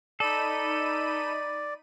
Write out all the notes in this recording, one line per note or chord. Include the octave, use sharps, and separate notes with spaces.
D#4 A4 D5 B5 D#7